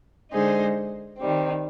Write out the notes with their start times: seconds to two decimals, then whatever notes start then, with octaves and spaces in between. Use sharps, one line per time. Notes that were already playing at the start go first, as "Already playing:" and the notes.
0.32 D3 G#3 D#4 G#4 C5
1.17 D#3 G3 C4